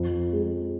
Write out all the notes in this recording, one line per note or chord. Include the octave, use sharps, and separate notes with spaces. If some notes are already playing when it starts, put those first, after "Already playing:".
Already playing: F2
G#3